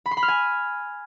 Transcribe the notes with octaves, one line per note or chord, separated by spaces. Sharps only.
B5
C6
B5
F6
G#5